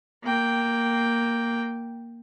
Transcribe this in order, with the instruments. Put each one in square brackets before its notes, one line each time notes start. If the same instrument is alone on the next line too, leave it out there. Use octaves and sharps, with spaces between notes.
[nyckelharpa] A#3 G5